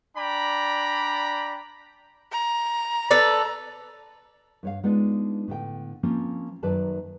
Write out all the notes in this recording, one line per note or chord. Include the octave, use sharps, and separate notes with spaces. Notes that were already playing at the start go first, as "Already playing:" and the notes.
D4 D5 G5 A#5 B5
A#5
A4 B4 D5
G2 C#5 F5
G#3 B3 D4 D#4 F4 D5
A2 D3 G5
F3 A#3 C4 C#4 F4
F#2 D#3 B4 D5 A5